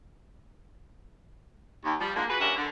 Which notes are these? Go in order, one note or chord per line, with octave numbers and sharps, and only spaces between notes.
D#2
F3 G3
D3 F3 G#3 A#3
F#4 G#4 B4
G2 C#4 A#4 E5 F#5
D3